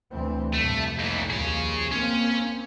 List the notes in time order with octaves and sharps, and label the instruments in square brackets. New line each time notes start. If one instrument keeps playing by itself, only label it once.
[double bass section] D2 E3 C4
[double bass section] C2 F2 A2 [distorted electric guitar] A3
[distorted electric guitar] D#2 E3
[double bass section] D#2 F3 [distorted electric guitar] G#4 C#5
[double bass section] A#3 C4 [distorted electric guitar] C#4